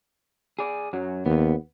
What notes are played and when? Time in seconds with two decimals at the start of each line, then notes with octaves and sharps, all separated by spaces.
0.59 G#4 D5
0.93 F#2 F#3
1.26 D#2 B3